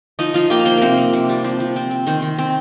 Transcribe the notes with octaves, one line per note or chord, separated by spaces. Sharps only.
F3 D#4 D#5
F3 F4 F5
A#3 G4 G5
A#5
A#3 C5 C6
C3 C4 A#4 C5
A#3
C3
G3
F3 C4 C5
F3
C4
C4
D#3 C4 C5
D#3
C4